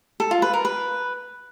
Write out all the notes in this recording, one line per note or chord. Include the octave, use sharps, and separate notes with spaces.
A4
F4
B4
A#4
B4